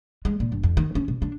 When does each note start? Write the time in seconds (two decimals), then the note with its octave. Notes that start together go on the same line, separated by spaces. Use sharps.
0.25 G#3
0.40 A#2
0.52 G1
0.63 F2
0.77 D#3
0.95 C#4
1.08 B2
1.22 D4